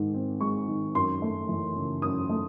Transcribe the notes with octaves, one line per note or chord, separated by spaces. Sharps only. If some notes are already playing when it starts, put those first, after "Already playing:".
Already playing: G#2 D#3 G#3
C4
G#3 C#6
D#3
F#2 C6
A3
E3
C#3
F#2 D#6
A3